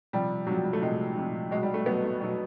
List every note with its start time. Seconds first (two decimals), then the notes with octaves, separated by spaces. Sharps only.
0.13 C3 F3 G3
0.47 C3 F#3
0.51 F3 G3
0.64 G3
0.73 A3
0.81 C3 F3 G#3
1.17 C3 F3
1.51 B2 G#3
1.54 F#3
1.63 G3
1.74 A3
1.86 B2 F#3 B3
2.04 A3
2.20 B2 F#3